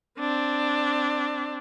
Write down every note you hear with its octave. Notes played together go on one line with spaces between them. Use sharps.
C4 D4